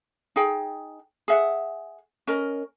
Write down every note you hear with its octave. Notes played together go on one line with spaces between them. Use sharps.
D#4 G#4 G5
G#4 E5 F#5
C#4 A#4 D#5